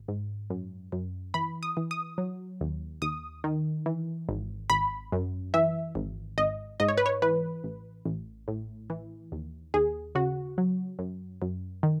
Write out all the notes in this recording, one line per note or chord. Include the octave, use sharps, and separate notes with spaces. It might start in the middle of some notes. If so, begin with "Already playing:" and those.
Already playing: G#1
G#2
F#2
F#2
E3 B5
D#6
E3
D#6
F#3
D#2
D#2 D#6
D#3
E3
G#1
G#1 B5
F#2
E3 E5
G#1
G#1 D#5
G#2 D#5
C#5
B4
C#5
E3 B4
A1
A1
A2
E3
D#2
D#2 G#4
C#3 F#4
F#3
F#2
F#2
D#3